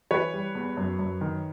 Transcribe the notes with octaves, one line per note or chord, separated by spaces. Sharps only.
E3 B4 C#5
G3
E2
F#2
F#2
D#3